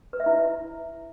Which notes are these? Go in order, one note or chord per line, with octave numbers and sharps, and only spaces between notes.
B4
E5
E4